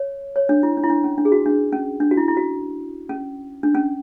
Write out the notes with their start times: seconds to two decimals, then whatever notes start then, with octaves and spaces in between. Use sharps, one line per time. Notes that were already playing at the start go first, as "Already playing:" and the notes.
Already playing: C#5
0.36 C#5
0.49 D4
0.63 E4
0.77 D4
0.84 E4
0.90 D4
1.04 C#4
1.18 D4
1.25 G#4
1.32 F#4
1.46 D4
1.72 C#4
2.00 D4
2.11 F#4
2.17 E4
2.28 E4
2.37 F#4
3.09 C#4
3.63 D4
3.75 C#4